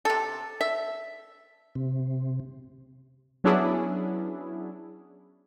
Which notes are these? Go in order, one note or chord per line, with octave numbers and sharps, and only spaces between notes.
C3 A4
E5
C3
F#3 B3 C#4 D4 E4 G#4